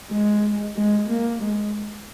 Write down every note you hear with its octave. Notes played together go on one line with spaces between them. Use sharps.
G#3
G#3
A#3
G#3